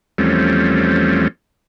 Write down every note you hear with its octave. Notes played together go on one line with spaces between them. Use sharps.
E2 F3 G3 A3 C4 C#4